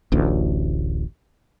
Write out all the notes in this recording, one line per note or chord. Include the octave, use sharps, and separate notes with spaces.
D1 A1 D2